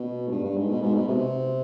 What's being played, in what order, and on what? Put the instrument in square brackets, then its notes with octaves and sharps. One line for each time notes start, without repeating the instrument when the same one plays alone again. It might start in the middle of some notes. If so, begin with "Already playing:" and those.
Already playing: [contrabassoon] B2
G#2
G2
G2
G#2
B2
G#2
B2
C3